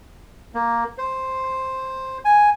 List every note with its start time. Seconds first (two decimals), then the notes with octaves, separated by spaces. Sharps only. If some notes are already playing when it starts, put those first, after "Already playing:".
0.55 A#3
0.98 C5
2.25 G#5